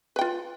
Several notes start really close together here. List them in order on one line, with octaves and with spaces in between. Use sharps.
B4 G5 F4